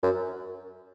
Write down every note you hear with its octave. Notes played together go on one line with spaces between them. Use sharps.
F#2